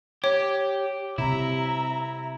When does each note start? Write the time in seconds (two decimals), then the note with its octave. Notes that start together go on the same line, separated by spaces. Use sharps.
0.24 G4 C#5
1.18 C3 E4 E5 A#5